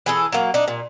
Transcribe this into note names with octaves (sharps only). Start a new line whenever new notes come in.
E3 G#4 A4
F#3 A#3
D4 D#4
A#2